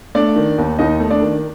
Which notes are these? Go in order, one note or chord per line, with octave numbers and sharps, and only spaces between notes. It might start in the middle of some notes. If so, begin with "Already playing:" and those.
A3 D4 D5
D#3
D#2
D#2 D#4 D#5
A3
D4 D5
D#3